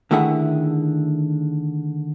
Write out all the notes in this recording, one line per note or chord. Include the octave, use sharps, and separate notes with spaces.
D3 D#3 A3 E4 G#4 F#5